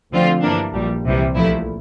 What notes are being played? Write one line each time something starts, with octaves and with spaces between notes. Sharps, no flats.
D2 D3 F3 C4 F4
G2 E3 A#3 D4
A#1 A#2 G3
C2 C3 E3 G3
A#1 A#2 F3 A3 E4